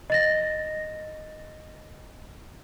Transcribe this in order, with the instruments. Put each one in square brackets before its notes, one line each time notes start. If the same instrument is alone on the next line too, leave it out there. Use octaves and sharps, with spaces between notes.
[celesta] D#5 A6 A#6